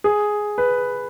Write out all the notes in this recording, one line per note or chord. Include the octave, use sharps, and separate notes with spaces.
G#4
B4